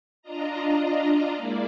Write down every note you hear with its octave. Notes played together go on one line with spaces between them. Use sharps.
D4 F4 D#5 A#5
G#3 A#3 E4 D5